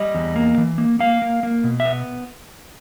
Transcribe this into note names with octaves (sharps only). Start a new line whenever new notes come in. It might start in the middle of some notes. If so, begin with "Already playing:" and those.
Already playing: G3 D#5
E2
A#3
E3
A#3
A#3 F5
A#3
A#3
B2
E5
B3